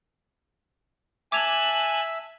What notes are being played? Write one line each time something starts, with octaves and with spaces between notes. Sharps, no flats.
E5 G#5 A5 D6 F#6 G#6 F7